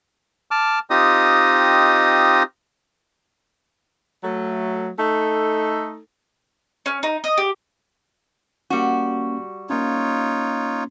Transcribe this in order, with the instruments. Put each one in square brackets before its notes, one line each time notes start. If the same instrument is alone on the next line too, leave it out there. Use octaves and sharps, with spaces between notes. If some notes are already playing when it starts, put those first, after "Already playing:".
[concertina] A5 D6 F6
C4 D#4 F4 G4 D#5 D#6
[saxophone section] F#3 A3
A3 D#4 A4
[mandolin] C#4
D#4
D#5
G4
[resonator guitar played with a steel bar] G3 F#4 [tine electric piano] A#3 C#4
[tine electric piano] A#3 C#4 [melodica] D#4 F4 C#5